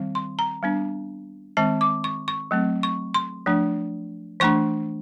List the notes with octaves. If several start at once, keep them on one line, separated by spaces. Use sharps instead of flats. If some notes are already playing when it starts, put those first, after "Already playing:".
Already playing: D#3 G3 C4
C6
A#5
G3 B3 D4
D#3 G#3 C4 A5
D6
C#6
C#6
F#3 A3 C4
C#6
C6
F3 A3 D4
E3 A3 D4 C#6